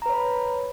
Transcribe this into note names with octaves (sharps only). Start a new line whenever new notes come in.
B4 C#5 A#5 B5